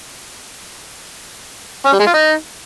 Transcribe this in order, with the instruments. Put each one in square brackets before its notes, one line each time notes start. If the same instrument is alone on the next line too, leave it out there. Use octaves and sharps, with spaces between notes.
[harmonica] C#4
G3
G#3
F4
D#4